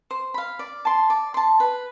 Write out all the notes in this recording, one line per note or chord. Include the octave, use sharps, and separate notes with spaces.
C5
F5 B5
D5
A5 C6
D5
A5 C6
B4